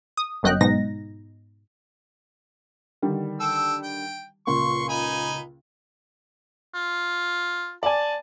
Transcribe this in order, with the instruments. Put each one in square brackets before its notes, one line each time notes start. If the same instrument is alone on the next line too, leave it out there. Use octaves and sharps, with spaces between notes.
[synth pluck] D#6
G1 F#2 F#3 D#5 G5 F#6
G#2 B2 D#4 A#6
[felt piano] D3 D#3 G3
[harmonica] A4 G5 E6
G5
[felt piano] C#2 A#2 A#3 [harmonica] C6 C#6
[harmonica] D#4 G#5 B5
[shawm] F4
[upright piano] D5 G#5 [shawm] A5